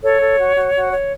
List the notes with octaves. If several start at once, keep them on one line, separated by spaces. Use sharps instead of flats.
A4 C#5
A4
F#4
F#4
F#4
C#5